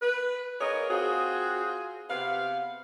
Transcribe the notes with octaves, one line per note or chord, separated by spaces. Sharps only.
B4
A#3 G#4 A#4 C#5 D#5
C4 F4 F#4 G#4
C3 B3 F5